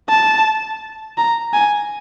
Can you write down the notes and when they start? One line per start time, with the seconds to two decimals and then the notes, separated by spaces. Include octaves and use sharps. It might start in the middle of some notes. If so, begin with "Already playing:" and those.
0.09 A5
1.17 A#5
1.53 G#5